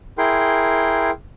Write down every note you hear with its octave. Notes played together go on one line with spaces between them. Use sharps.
E4 G#4 A#4 G5 C6